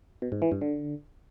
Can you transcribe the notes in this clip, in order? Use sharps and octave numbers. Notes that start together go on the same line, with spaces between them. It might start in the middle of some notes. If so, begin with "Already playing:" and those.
B2
G#2
E3
G2
D3